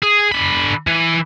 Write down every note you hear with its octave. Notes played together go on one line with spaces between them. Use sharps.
G#4
D3 B5
E3